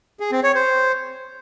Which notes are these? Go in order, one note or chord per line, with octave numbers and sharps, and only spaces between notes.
G#4
C4
C#5
C5